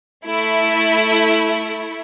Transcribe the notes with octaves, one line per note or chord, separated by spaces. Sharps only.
A3 E4